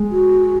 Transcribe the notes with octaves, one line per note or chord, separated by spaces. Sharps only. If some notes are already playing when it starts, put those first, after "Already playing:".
Already playing: G#3
F#4